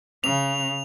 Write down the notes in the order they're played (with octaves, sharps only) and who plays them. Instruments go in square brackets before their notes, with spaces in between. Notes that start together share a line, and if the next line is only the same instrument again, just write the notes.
[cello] C#3 [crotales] F7